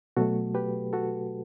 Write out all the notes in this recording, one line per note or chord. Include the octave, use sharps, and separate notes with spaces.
B2 F#3 A3 F#4 A4
G4 B4
F#4 A4